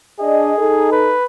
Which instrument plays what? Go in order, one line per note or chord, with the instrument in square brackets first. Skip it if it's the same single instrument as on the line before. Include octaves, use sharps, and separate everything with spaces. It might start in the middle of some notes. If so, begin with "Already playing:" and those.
[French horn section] D4 D#5 [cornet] G#4
[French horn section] D#4 A4
[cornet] B4